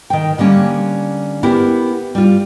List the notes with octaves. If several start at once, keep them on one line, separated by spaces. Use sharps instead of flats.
D#3 G5
D3 G3 A#3 C#4
B3 E4 G4 A#4
G3 F4